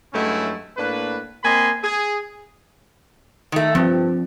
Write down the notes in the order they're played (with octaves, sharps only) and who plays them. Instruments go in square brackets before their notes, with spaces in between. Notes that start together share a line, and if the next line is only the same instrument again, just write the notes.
[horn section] G2 F#3 G#3 A3 C#4 E4
A2 A#3 D4 B4
A#3 C4 D#5 G#5 B5 C6
G#4
[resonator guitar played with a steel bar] D#3 A3
[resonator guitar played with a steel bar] G2 [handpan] F3 C4